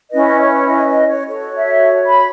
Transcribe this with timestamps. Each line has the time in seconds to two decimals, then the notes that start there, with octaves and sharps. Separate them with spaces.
0.11 C#4 E4 B4 D#5
0.40 C#5
0.69 D#5
0.88 D#5
1.08 C#5
1.28 F#4 A4 C#5
1.56 E5
2.06 B5